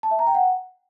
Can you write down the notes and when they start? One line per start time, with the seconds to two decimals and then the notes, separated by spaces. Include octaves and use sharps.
0.03 A5
0.11 E5
0.19 A#5
0.27 G5
0.35 F#5